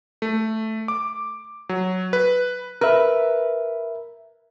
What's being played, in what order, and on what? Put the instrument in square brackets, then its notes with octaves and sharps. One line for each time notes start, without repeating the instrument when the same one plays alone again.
[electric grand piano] A3
D6
F#3
B4
[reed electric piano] A#4 E5 [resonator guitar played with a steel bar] B4